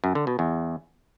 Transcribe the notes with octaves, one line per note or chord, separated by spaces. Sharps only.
F#2
D3
B2
E2